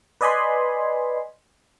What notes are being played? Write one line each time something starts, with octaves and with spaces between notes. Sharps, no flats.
B4 D5 D#5 G#5 B5 C6